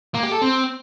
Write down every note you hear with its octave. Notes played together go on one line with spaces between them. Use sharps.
A#3
G4
A4
C4